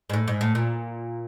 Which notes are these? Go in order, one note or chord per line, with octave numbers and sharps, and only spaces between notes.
G#2
A2
G#2
A2
A#2